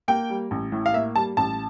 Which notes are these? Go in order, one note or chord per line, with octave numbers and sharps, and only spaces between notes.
A#3 G5
G3
A1
A2
F5
A#3 E5
G3 A5
A1 A5